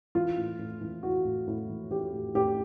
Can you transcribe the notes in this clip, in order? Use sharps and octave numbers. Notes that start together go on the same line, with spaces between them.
E3 F4
A2
A2
E3
E3 F#4
A2
A2
E3
E3 G4
A2
A2 G4